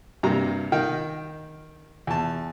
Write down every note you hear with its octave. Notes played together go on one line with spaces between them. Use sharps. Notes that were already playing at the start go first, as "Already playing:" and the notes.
G2 C3 A#3 A#5
D#3 A#4 F5 G5
E2 A5